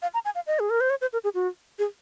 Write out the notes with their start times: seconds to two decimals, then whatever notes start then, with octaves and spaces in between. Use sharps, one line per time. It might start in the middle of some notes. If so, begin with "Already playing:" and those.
0.02 F5
0.14 A#5
0.25 G#5
0.35 F5
0.47 D#5
0.59 G#4
0.70 A#4
0.81 C5
0.90 C#5
1.01 C5
1.13 A#4
1.24 G#4
1.35 F#4
1.79 G#4